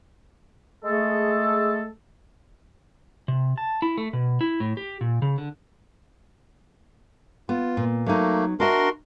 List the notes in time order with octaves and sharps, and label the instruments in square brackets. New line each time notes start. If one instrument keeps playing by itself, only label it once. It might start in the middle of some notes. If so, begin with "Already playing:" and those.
[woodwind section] G#3 A3 G#4 A4
[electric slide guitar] C3
A5
E4
A3
B2
E4
A2
G4
A#2
C#3
D3
[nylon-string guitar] B3 [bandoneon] F4
[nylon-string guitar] A#2
[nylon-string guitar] F#3 D#4 [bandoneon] A3 A#3
[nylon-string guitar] D4 D#5 E5 [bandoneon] F#4 A#4 C6